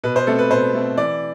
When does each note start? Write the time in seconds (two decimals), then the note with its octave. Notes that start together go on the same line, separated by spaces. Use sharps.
0.04 B2 B4
0.16 C5
0.27 A3 C4 A4
0.39 B4
0.50 B2 C5
0.74 A3 C4
0.98 E3 D5